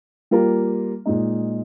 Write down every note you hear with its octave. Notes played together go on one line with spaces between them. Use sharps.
G3 A#3 F4 A#4
A#2 G#3 D#4